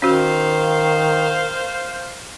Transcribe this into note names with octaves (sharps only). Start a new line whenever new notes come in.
D#3 C#4 F#4 C5 F5